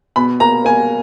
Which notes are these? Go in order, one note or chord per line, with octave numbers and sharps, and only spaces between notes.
B2 B5
A#3 A#5
A#3 G#5